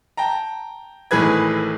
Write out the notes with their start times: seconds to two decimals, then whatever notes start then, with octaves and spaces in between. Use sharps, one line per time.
0.17 G5 A5 A#5
1.11 G#1 A2 E3 G#4 B4 G#6